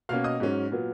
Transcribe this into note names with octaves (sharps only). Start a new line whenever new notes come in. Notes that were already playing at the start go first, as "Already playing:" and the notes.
B2 A#3 C#4 F5 F6
D#5 D#6
G#2 F#3 C#4
A#2 F#3 B3